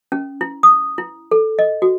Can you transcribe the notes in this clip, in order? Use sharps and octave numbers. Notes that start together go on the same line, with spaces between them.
C#4
E4
D#6
E4
A4
D#5
F#4